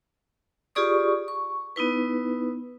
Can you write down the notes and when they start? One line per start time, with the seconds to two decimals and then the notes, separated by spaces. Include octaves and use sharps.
0.75 F4 G4 G#4 D5 C#6 D#6
1.28 C#6
1.76 B3 D#4 E4 B4